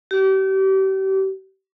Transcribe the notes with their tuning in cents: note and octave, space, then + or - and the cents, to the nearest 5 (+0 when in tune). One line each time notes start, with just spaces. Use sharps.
G4 -35